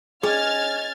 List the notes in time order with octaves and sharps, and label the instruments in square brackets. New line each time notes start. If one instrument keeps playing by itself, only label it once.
[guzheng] C#4 [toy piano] G#4 [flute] D#5 [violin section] F6 G#6 A6